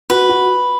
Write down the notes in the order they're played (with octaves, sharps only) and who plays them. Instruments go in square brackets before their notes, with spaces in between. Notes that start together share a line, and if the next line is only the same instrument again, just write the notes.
[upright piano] F#4 [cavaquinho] B4
[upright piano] F#4